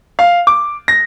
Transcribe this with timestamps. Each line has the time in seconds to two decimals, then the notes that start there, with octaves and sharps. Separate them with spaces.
0.19 F5
0.47 D6
0.88 A#6